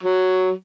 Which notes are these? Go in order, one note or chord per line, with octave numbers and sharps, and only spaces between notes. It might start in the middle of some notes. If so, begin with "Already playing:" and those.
F#3